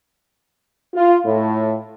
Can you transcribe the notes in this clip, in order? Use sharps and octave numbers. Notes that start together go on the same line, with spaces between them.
F4
A2